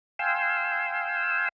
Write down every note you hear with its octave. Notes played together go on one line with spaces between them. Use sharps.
F5 G5 G#5 C6 E6